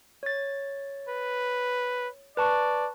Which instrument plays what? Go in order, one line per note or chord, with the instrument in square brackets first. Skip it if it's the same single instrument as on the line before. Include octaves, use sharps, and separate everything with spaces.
[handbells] C#5 A6
[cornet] B4
[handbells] B4 A5 C#6 [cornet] D5